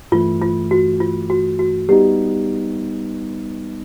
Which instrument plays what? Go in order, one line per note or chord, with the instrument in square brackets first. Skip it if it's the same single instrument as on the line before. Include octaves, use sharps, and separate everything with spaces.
[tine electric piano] G2 E3 A3 [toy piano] F4
[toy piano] F4
F#4
F4
F#4
F#4
[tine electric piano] G3 B3 D#4 [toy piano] G4